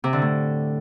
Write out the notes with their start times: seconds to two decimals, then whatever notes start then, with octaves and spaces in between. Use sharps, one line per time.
0.04 C3
0.13 D3
0.22 A2